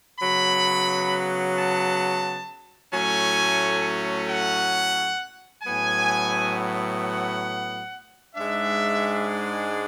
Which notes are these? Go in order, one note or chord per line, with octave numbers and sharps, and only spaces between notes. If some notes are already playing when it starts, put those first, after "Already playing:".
C#3 F#3 B3 B5
A5
A2 F#3 A3 C#4 G#5
F#5
A2 F#3 B3 G#5
F#5
G#2 G#3 D4 E5